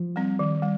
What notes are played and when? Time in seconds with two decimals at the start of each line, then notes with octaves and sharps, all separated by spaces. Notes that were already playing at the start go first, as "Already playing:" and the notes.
Already playing: F3
0.16 G3 C4
0.39 D#3
0.62 G3